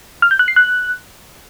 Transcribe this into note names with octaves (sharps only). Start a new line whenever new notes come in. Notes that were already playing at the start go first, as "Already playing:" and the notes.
F6
G6
F#6
C7
F#6